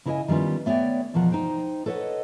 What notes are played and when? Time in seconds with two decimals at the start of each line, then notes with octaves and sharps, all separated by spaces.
0.06 C#3 E4 A#4 C#5 D#5 G#5
0.28 D#3 G3 B3 C#4 F4
0.66 A3 B3 C#5 D5 G5
1.14 E2 B2 F3 A#4 F#5
1.32 D#4 C5 G5
1.86 A4 B4 C#5 D#5 F#5